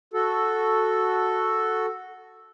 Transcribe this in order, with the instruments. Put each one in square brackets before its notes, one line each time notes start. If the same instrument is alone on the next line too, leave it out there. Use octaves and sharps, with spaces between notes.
[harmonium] F#4 A4